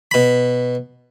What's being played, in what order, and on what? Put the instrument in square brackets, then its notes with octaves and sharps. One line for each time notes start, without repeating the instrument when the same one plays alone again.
[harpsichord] B2 B5